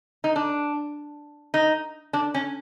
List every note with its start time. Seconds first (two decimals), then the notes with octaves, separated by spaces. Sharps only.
0.24 D#4
0.36 D4
1.54 D#4
2.13 D4
2.34 C#4